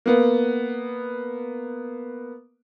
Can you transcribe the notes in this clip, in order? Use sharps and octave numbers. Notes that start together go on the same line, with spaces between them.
A#3 B3